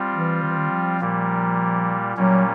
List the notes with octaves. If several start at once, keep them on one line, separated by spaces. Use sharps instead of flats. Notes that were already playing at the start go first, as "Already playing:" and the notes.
Already playing: G3 C4 F4
E3
D#3
E3
D#3
F3
A#2 G3 A#3
A#2 F#3 G3 A#3 C#4